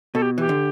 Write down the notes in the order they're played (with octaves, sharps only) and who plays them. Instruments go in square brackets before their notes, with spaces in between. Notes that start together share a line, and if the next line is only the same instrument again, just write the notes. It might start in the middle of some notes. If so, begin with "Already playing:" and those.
[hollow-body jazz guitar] B2 [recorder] A4
[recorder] G4
[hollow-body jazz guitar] E3 [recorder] G4
[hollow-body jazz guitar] D3